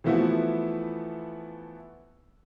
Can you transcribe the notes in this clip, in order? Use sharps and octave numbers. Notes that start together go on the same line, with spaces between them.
E3 F3 A3 B3 E4 F#4